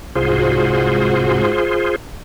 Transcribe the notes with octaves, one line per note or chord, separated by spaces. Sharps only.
C2 G#2 F4 F#4 G#4 C5